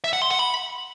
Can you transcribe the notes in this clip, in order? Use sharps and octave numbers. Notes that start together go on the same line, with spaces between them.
E5
F#5
C6
F#5
B5